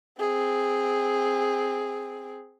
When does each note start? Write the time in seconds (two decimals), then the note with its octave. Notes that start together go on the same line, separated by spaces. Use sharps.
0.20 C4 G#4